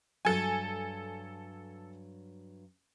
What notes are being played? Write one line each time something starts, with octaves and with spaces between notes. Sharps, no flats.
G2 F#3 A4 G#5